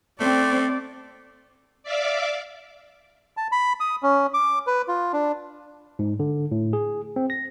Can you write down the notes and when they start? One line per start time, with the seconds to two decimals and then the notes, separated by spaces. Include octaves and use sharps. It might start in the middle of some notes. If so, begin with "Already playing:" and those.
0.20 A3 C4 D5
1.83 D5 E5 F5 D6
3.37 A5
3.52 B5
3.80 D#6
4.03 C#4
4.34 D6
4.67 B4
4.88 F4
5.13 D4
5.99 G#2
6.20 D3
6.52 A2
6.73 G#4
7.16 C4
7.30 A#6